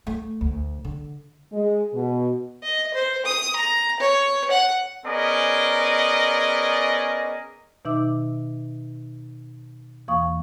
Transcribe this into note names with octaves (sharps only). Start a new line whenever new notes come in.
A3
D2
D3
G#3
B2
D#5
C5
D#6
A#5
C#5
F#5
B3 C#4 G#4 A#4 D5 D#5
B2 D#3 D#4 E5 D6 E6
E2 E3 A#3 F5 C#6 D#6